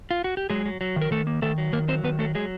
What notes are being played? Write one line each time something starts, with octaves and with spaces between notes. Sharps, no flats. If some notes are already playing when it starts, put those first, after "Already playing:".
F4
F#4
G4
F#3 G#3 G#4
F#3
F#3
D#3
A#4
D#3 A3 A4
A#3
D#3 A3 A4
F#3
D#3 A#3 A#4
F#3 C4 C5
D#3 B3 B4
F#3 A3 A4
F#3 G#3 G#4